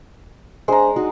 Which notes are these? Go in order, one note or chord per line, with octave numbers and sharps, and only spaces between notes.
G#3 D4 C5 A#5
D#4 F#4